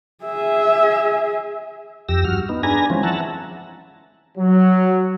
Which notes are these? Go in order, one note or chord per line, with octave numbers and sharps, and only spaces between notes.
G#4 E5
F2 G4 E6 A#6
G2 F#4 F6
B3 D#4
D4 G#4 B4 G#5 A#5 A#6
E3 F3 G#3 C4 C#4
E5 F#5 A5 A#5
F#3